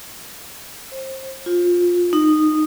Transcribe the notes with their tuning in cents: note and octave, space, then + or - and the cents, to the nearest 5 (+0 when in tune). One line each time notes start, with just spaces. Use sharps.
C5 +25
F4 +15
D#4 -15